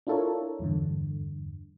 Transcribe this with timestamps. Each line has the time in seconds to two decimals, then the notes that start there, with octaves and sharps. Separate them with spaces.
0.07 D4 E4 F4 A4 A#4 C#5
0.59 E2 G2 D3